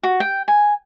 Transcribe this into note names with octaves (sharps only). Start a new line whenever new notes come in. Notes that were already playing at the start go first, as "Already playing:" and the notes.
F#4
G5
G#5